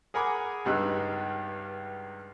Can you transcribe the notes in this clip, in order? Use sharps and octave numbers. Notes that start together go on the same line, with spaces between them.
G#4 A#4 F#5 G#5 B5 D6
C#2 G2 G3 D#4 E6 F#6